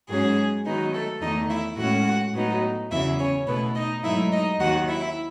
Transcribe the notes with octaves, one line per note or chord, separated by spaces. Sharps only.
G#2 F#3 C#4 G#4
D#3 F#3 B3 D#4
A3 A4
E2 D#3 A3 D#4 D#5
E4 E5
A2 G#3 C#4 F#4 F#5
A2 F#3 B3 D#4
E2 C#3 F#3 E4 E5
C#4 C#5
B2 A3 B3 E4 B4
D#4 D#5
G#2 F#3 A3 D#4 E4 E5
D#4 D#5
D#2 D#3 F#3 F#4 F#5
E4 E5